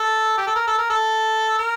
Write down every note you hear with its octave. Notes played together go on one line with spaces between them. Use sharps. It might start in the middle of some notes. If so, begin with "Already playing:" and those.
Already playing: A4
G4
A4
A#4
A4
A#4
A4
A#4